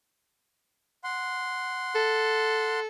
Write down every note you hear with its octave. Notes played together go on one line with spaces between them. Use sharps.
F#5 C6
A4